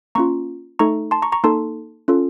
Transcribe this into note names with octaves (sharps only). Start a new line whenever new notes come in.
A#3 C#4 F4 A#5 C#6
A3 D#4 A4 A#5 C#6
A5 C6
A#5 C#6
A#5 C#6
A#3 D#4 A4 A5 C6
C#4 F4 A4